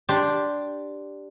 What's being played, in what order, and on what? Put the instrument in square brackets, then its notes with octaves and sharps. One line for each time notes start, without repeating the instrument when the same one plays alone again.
[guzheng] D4 G4 C5 D5